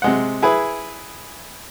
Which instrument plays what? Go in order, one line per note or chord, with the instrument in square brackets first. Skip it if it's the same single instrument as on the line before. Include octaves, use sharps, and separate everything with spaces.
[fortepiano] C3 G#3 F#5
E4 G#4 B4